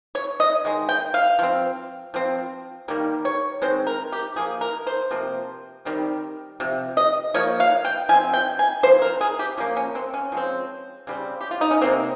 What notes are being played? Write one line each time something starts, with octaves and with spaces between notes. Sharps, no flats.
C#5
D#5
D#3 G#3
G5
F5
F3 C4
F3 C4
D#3 G3 A#3
C#5
D#3 G#3 C4 C5
A#4
G4
F3 A#3 G#4
A#4
C5
C3 F3 A#3
D#3 G3 C4
C3 F3
D#5
F3 A#3 C#5
F5
G5
F3 C4 G#5
G5
G#5
F3 C4 C5
A#4
G#4
G4
F3 A#3 C#4
C#4
C4
C#4
F3 G#3 C4
C#3 G3 C4
G4
F4
D#4
C#4
C3 G3 A#3 C4